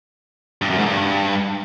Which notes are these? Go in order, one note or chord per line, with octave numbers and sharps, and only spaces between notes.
G2
F#2
G#2
G2